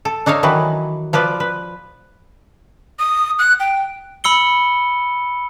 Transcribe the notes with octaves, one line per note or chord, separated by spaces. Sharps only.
A4
D4 D#4 A4 C#5 F5
D#3 E3 F#3 B4
F3 F4 B4 D5
B4
D#6
F#6
G5
B5 E6 C#7 G7